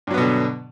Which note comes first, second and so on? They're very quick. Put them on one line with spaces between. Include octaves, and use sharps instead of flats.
G2 F#3 B3 B2 D3